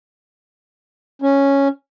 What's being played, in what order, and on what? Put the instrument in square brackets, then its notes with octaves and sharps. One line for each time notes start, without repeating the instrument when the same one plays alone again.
[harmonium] C#4